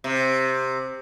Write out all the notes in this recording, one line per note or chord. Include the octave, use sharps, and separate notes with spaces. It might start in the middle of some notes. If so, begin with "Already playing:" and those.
C3